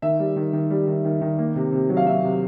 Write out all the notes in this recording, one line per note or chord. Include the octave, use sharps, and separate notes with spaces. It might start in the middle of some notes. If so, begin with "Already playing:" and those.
D#3 E5
G3
D#3
D#3
G3
D#3
D#3
D#3
A#3
C3
C3
F#3
F5
F#3 E5
C3